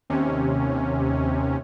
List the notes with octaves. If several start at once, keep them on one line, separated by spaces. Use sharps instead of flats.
D#2 C3 C#4